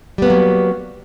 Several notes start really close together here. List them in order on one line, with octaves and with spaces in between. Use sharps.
G3 B3 A#3 F#3